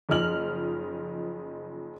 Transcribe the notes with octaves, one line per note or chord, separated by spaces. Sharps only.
F#1 F3 D#4 F6 F#7